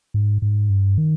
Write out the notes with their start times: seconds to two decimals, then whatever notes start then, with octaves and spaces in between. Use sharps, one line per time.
0.14 G#2
0.42 G#2
0.70 G2
0.98 D#3